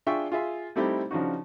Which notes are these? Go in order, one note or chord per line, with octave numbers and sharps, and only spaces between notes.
D4 F4 G#4 E5 G5 C#6
F4 G#4 E5 C6
G3 A3 C4 D#4 E4 G4
C#3 F3 D4 D#4 F#4